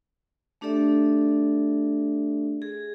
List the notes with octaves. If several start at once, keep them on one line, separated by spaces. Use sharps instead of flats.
A3 D4 G4 A4 D5 E5
G#4